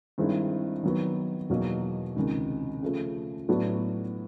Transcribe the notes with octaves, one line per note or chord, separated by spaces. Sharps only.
G2 D#3 G#3 C4 E4
D#3 F#3 B3
E2 B2 F#3 A#3 D#4
C#2 C3 D#3
C#3 F3 A3
A2 F#3 B3 D4 F#4